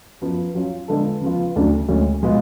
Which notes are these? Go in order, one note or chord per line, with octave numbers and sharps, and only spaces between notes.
F#2 F3 B3
F#3 C#4 F4
D3 G#3 B3 F4 A4
C#3 F3 B3 F4
D2 C#3 F#3 A3 D4
D2 C#3 G#3 C#4
B2 G#3 B3 F4